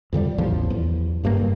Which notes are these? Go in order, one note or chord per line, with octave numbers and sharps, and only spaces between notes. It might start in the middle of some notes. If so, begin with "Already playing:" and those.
F2 D3 E3 G3
A1 E2 F3
E2
F#1 G2 A#2 A#3